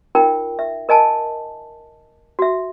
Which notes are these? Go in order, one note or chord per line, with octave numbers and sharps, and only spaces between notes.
D#4 F4 A#4 G5
E5
A#4 D#5 G#5 A5
F#4 E5